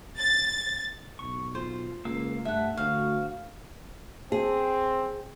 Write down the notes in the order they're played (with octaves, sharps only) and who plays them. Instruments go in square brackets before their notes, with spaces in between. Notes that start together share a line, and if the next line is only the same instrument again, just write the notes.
[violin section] A6
[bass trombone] B1 [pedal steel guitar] C#6
[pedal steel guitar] F4 [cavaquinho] C5
[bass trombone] C#2 [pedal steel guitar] A#3 F5 E6
[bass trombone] G2 [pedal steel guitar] A3 [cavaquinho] E5 F#5
[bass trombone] D2 [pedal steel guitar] F#4 [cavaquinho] F5
[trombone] C4 [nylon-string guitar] G#4